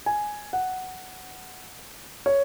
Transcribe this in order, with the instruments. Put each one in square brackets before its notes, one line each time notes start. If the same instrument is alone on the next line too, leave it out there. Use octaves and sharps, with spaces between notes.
[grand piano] G#5
F#5
C#5